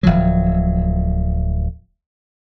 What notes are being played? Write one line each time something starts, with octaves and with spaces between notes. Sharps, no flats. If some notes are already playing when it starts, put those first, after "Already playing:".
D1 C2 F3 F#3